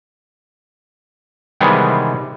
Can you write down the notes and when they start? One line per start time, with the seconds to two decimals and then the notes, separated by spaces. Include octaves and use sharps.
1.61 C3 D#3 E3 G3 G#3 B3